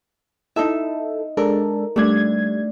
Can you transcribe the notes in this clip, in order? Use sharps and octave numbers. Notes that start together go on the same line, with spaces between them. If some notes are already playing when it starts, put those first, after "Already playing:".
D#4 E4 A4 E5
G#3 D4 A4 A#4
G3 A3 D4 G#6